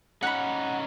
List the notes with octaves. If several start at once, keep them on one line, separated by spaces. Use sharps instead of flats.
C#4 D#4 F#5 B5